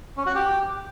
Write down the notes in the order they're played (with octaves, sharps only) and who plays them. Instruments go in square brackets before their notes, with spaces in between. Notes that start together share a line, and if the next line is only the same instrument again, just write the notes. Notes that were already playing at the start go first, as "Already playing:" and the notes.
[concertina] C#4
F#4
G4